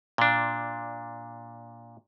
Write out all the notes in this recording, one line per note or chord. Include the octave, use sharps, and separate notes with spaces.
A#2 D4